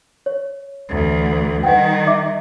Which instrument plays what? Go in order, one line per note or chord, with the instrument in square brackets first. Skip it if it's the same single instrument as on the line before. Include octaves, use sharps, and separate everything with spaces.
[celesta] C#5
[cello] D2 E3
[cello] D#3 G3 [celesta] B4 F#5 G5
[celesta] D#5 E5 D6